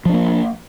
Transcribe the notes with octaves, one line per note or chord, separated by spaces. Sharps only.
F3 A#3 D4